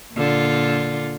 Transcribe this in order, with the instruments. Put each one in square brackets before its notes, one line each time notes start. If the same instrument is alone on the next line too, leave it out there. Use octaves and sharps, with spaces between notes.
[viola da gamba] A#2 D3 F4